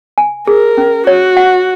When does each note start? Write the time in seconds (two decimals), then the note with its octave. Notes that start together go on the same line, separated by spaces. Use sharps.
0.18 G#5
0.47 G#4 A#4
0.77 C#4
1.07 F#4 C#5
1.37 F#5